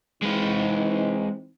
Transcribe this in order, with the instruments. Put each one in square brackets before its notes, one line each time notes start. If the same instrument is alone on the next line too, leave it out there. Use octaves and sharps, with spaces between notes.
[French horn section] E3 C4 D#4 [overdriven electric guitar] G#3 B4